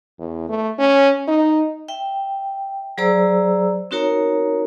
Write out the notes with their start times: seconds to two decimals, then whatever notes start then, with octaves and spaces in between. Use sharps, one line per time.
0.19 E2
0.49 A3
0.79 C#4
1.28 D#4
1.88 E5 G5
2.98 F#3 G#4 C5 D5 A#5 E6
3.91 C4 D#4 F#4 A#4 C#5 A#5